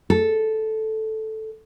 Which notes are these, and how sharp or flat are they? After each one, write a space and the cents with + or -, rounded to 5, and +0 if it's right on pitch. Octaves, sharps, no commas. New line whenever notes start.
A4 -5